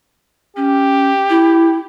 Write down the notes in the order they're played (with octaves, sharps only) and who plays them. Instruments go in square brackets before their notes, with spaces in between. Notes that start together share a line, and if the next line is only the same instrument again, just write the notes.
[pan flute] C#4 [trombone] G4
[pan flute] E4